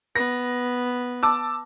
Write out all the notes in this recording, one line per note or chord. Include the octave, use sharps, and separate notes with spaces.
B3 A#6
A5 D6 E6